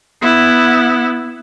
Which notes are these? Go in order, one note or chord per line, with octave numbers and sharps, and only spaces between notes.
B3 E4